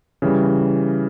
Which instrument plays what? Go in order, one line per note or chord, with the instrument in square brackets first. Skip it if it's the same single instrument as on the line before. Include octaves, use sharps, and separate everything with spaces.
[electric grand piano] C#3 E3 G3